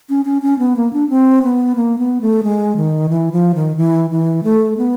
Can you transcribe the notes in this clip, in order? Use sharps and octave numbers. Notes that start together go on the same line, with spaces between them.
C#4
C#4
C#4
B3
A#3
D4
C4
B3
A#3
B3
A3
G#3
D#3
E3
F3
D#3
E3
E3
A3
B3